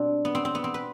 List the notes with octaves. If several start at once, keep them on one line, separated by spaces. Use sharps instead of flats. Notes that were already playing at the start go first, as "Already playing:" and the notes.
Already playing: B2 G3 C4 D4
B3
C4
C4
B3
C4
B4